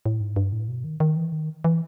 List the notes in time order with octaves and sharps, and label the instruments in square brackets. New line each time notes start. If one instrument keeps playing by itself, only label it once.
[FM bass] A2
G#2
G2
A2
B2
D#3
D#3
E3
D#3
E3